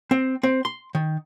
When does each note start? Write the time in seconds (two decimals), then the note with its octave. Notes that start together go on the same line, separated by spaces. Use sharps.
0.11 C4
0.43 C4
0.65 C6
0.95 D#3